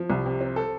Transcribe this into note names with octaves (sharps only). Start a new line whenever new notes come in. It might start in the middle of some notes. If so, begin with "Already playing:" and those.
Already playing: F3
C2
C3
C4
A4